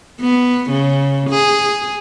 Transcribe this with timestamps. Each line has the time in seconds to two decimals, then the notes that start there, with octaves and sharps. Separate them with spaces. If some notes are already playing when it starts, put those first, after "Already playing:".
0.20 B3
0.70 C#3
1.30 G#4